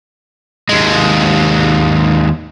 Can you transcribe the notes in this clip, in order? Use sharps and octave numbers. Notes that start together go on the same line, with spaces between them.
D#2 G#3